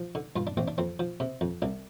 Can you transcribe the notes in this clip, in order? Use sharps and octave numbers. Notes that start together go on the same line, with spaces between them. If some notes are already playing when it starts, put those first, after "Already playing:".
Already playing: F3
D3
G2 F4
D4
A1 C4
D4
F2 C4
F3
C3
F2
C2 D4